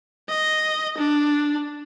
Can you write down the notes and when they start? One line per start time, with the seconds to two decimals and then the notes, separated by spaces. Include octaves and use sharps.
0.29 D#5
0.98 D4